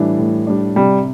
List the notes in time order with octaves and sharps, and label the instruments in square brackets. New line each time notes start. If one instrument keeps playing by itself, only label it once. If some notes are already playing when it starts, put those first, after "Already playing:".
Already playing: [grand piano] A2 G3 D4 [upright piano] E3
[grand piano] A2
G3 D4
[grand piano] C3 [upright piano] G3